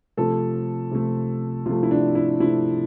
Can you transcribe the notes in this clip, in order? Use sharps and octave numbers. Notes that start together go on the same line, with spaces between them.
C3 F3 A3 A4
C3 F3 A3
C3 F3 A3 F4
E4
D4
E4
C3 F3 A3 E4